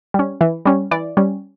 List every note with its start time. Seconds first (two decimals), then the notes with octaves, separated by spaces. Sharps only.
0.14 G3 C#4
0.41 E3
0.65 G3 C#4
0.91 E3 D5
1.17 G3 C#4